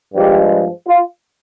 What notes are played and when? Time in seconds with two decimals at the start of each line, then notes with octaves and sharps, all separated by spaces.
0.14 G2 F3 G#3 G4
0.88 F4